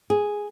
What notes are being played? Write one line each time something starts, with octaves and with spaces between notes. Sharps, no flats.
G#4